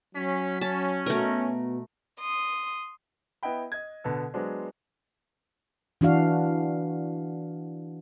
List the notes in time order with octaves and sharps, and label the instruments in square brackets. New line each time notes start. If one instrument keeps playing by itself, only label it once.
[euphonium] F#3 [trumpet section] C#4 [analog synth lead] B6
[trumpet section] C#4 [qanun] A5
[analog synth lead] B2 [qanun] A3 A#4
[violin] C6 D#6
[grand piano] B3 E4 D#5 F#5 G5 B5
D#5 G#6
B2 D3 B3 A4
F#3 G#3 B3 D4 C5
[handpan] E3 D4 F#4 F5